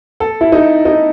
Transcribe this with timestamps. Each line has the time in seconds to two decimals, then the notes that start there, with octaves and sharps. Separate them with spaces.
0.20 A4
0.41 E4
0.52 D#4
0.85 D#4